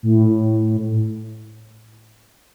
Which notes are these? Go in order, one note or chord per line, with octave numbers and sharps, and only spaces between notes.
A2